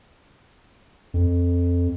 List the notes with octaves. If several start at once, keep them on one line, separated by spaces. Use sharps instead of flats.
F2